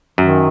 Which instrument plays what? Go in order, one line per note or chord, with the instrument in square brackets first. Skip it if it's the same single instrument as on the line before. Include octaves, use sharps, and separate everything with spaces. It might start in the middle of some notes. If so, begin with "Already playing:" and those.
[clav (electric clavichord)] F#2 [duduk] D#3